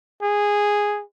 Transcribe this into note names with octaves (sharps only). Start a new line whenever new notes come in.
G#4